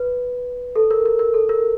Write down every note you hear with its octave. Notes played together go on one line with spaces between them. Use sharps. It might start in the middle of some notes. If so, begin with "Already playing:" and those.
Already playing: B4
A4
A#4
A#4
A#4
A4
A#4